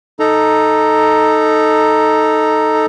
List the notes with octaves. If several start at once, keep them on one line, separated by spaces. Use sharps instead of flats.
D#4 A4 A#5